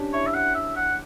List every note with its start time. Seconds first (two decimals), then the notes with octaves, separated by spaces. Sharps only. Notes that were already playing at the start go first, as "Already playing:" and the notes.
Already playing: C#4 D4 G4
0.13 E4 C#5
0.27 E5
0.34 F#5
0.55 E5
0.76 F#5